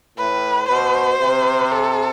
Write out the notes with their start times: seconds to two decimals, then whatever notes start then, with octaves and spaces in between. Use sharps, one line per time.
0.18 A2 B4
0.69 B2 C5
1.20 C3
1.72 A4